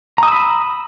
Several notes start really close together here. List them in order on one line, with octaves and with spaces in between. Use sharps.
A#5 D#6 E6 B5